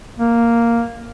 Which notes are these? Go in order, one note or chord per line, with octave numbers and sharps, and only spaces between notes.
A#3